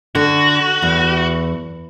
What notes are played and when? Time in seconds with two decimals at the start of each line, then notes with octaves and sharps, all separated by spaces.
0.15 D3 F#4
0.82 E2